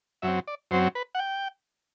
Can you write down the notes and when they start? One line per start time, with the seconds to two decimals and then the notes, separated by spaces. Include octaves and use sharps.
0.22 F#2 F#3 C4 E5
0.47 D5
0.71 F#2 F#3 C4 C5
0.95 B4
1.15 F#5
1.19 G5